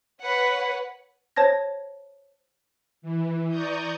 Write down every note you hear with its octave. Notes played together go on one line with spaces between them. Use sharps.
B4 C#5 F#5
C5 C#5 A5 G#6 A#6
E3
D5 A#5 C#6 D#6 G6